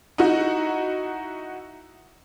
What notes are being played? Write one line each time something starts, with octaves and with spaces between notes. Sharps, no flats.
D#4 E4 F#4